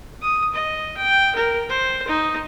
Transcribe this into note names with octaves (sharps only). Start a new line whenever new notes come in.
D#6
D#5
G5
A#4
C5
D#4